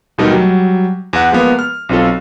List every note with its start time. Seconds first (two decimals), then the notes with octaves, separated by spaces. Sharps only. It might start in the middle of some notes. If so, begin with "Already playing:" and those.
0.18 D#2 B2 G3 A3 D#4 A#4
0.32 F#3 G3
1.13 E2 F#5
1.31 F3 G#3 A#3 B3
1.59 F6
1.89 B1 C4 F4 A4